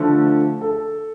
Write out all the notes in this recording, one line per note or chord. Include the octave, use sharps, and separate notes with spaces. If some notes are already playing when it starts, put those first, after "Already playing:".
Already playing: D3 F3 A3 A4
A4